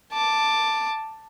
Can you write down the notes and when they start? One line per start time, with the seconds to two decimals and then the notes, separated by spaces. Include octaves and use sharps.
0.12 A5 D6